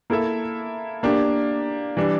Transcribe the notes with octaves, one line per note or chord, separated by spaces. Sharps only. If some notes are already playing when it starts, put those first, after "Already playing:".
A#3 E4 A4 E5
A#3 D4 G4
E3 G3 D4